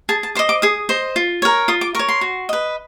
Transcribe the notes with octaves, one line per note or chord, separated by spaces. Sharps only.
G#4 A5
A5
C5 D#5 D6
D6
G#4 D#6
C5 D#5
F4
A#4 C#5
F4 D#6
D6
A#4 C#5 C#6
C6
F#4
B4 D#5